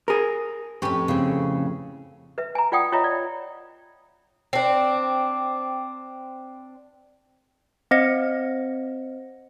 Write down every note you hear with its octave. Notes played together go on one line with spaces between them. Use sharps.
G#4 A#4
F2 A2 C#4 G4 B4
C#3 C4
B4 E5
G#5 A#5
F4 D5 F#5 G5 D#6
F4 C#5 D#5 E5 A#5
D5
C4 D4
C4 C5 D#5 F#5 A#6 C#7